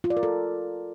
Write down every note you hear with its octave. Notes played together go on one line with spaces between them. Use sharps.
F4
D5
A#4
A4